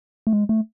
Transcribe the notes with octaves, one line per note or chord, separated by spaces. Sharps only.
A3
G#3
A3